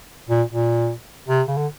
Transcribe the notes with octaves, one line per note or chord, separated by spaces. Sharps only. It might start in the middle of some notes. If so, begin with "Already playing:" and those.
A#2
A#2
C3
C#3
D3